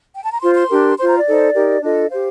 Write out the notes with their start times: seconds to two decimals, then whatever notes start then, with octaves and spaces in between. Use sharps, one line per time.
0.14 G5
0.24 A5
0.32 A#5
0.41 F4 C5 C6
0.56 C6
0.70 D4 G4 A#4
0.98 F4 C5 C6
1.07 A#5
1.17 D5
1.27 D#4 A4 C5
1.55 D#4 G4 A#4
1.82 D4 F4 A4 D#5
2.10 G4 C5 F5